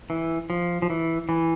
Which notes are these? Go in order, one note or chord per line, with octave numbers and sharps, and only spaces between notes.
E3
F3
F3
E3
E3